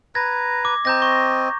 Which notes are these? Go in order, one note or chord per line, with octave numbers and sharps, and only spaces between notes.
B4 A#5 G#6 A#6
D6
C4 D#5 A#5 G6 A#6
C#6